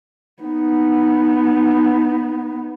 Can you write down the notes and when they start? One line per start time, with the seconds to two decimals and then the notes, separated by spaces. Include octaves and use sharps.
0.43 B3 D#4